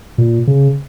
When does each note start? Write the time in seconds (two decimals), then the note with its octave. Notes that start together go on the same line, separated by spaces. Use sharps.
0.18 A#2
0.47 C#3